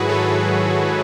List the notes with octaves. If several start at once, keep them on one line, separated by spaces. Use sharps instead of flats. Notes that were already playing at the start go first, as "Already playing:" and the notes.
Already playing: G#2 D#3 F#3 E4 F#4 G#4 B4
A4 C#5